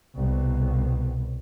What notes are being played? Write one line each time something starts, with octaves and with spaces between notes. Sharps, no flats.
C2 B2